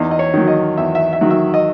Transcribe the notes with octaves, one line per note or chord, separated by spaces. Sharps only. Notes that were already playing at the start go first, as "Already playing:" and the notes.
Already playing: E2 D#4
D#5
C#5
D#3 F#3
D#5
E2 E5
E5
E5
D#3 F#3
E5
D#5